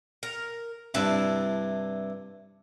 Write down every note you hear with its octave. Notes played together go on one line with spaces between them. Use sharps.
A#4
G2 C3 D4 E4 A5